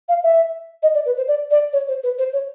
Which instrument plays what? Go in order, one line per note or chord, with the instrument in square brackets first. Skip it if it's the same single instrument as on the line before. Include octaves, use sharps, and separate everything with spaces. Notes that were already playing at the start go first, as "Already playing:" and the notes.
[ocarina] F5
E5
D#5
D5
B4
C5
D5
D5
C#5
C5
B4
C5
C#5